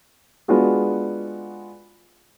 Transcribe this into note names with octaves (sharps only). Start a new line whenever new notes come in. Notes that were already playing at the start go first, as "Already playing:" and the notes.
G#3 B3 D4 F4 F#4 G#4